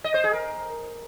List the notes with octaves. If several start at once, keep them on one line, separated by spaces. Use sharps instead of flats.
D#5
C5
G#4
A#4